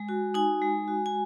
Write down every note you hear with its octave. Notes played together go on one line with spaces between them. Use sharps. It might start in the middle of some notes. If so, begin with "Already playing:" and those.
Already playing: G#3 G#5
F#4
D#4 G#5
G#3
F#4
G#5